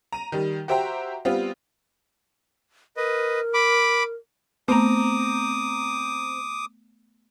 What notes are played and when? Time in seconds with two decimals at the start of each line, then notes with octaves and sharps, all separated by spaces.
0.12 A#5 D#7
0.32 D#3 G3
0.68 F#4 G4 C5 E5 G5 A#5
1.25 G3 B3 C4 F4
2.97 A#4 B4 D#5
3.54 B5 D6
4.68 A3 B3 C4 A#5 D6 D#6